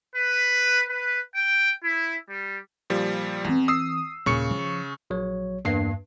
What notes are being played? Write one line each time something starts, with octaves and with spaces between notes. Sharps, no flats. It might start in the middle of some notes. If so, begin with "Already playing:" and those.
B4
B4
G5
E4
G3
A#2 F3 G3
E2 E3 C4
D#6 E6 C7
D#2 A#2 C#3 C#6 C#7
F3
A#1 F#3 C#5
E2 G2 A#3 C7